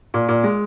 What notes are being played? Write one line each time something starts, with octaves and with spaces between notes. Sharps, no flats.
A#2
A#2
G#3